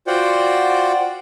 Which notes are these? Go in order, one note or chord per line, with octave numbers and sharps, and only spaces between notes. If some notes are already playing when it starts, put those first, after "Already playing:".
F4 F#4 C5 D5 F#5 G5